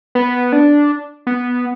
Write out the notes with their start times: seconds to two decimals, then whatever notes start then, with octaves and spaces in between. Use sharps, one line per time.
0.15 B3
0.52 D4
1.27 B3